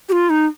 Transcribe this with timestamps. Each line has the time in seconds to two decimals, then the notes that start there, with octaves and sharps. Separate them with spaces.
0.09 G4
0.12 F4
0.30 D#4